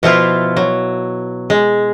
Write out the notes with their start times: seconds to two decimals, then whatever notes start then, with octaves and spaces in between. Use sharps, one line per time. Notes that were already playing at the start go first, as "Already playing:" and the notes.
0.03 B2 F3 E4 F4
0.56 F#3
1.50 G#3